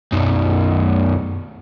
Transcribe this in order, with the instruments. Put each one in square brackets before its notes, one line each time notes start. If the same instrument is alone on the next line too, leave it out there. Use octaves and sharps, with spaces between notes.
[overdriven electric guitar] B1 F#2